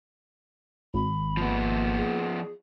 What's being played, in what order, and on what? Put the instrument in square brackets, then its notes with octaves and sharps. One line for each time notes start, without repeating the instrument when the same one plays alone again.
[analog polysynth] G#1 [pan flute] B5
[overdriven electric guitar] F3 B3 [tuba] A#3
[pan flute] G#4